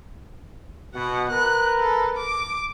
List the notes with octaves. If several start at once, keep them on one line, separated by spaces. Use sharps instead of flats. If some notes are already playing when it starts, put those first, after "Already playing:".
B2 F#5
A#4 B4 F#6
A4
D6